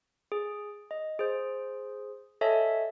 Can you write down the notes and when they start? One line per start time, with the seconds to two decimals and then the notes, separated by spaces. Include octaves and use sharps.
0.32 G#4
0.91 D#5
1.19 G#4 C5
2.41 A4 C#5 D#5 E5 G#5 A5